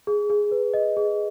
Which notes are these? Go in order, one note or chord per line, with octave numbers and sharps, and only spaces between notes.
G#4
G#4
B4
D#5
G#4